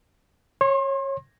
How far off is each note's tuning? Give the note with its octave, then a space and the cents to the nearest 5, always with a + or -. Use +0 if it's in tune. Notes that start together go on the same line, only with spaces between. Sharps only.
C#5 -20 C6 +35